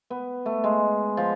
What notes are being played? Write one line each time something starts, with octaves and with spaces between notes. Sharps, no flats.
B3
A3
G#3
F3